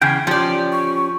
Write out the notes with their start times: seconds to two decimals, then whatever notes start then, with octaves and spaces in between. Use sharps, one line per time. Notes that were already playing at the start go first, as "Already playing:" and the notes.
0.02 E2 C#3 G5 G#5
0.27 F3 C#4 G4 D5
0.72 C#6